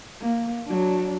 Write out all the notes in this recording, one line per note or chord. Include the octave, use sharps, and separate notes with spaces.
A#3
F#3 D4